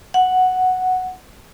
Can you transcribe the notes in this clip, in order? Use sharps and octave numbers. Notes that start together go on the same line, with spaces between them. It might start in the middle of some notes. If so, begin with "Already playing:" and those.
F#5